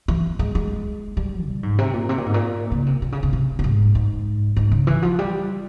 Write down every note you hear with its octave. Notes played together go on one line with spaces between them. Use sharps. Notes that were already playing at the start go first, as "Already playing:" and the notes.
E3
G#3
G#3
G3
A#2
G#2
C3
A#2
C3
A#2
G#2
A#2
C#3
C3
C3
C#3
C3
C3
A#2
G#2
G#2
G#2
C#3
E3
F3
G3